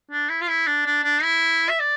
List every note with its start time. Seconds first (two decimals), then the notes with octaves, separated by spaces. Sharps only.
0.11 D4
0.29 E4
0.42 F4
0.48 E4
0.67 D4
0.86 D4
1.04 D4
1.23 E4
1.69 E5
1.80 D5